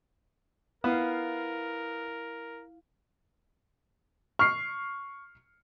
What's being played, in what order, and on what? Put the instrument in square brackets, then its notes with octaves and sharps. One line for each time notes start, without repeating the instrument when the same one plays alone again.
[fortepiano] B3 [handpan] E4 F5 [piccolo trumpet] A#4
[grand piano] C#6 [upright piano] F6 C7